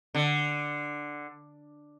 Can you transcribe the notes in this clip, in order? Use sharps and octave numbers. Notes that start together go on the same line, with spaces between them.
D3